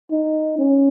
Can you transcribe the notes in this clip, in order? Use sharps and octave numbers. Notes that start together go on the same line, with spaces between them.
D#4
C#4